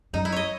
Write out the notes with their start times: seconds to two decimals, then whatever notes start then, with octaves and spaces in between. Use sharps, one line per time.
0.13 F#2 D#4
0.25 E4
0.32 C#5 D#5